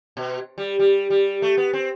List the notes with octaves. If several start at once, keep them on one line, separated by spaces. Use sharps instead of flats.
B2
G3
G3
G3
A3
B3
C4